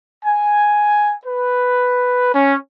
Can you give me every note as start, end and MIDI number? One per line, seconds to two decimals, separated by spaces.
0.24 1.13 80
1.25 2.34 71
2.34 2.56 61